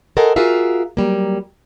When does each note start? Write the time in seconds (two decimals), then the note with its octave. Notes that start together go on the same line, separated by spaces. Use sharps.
0.17 A4 A#4 C5 D#5 F#5 G#5
0.36 F4 F#4 G#4 A#4 E5 F5
0.97 F#3 G3 A#3